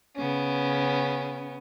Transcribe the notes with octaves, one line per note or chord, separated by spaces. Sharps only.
C#3 B3 C#4